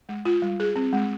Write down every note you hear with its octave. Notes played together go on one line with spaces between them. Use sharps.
G#3
F4
G3
G#4
C4
G#3